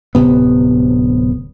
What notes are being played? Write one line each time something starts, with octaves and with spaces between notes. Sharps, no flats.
D1 A2 C3 B3